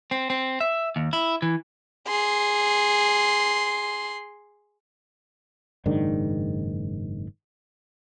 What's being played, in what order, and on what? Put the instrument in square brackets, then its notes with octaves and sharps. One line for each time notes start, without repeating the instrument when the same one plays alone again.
[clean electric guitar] C4
C4
E5
D#2
E4
E3
[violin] G#4 C6
[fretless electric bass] F#1 G#2 D#3 D4